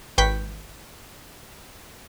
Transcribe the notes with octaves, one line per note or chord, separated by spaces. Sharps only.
G#1 B4 G5 C#6 G6 B6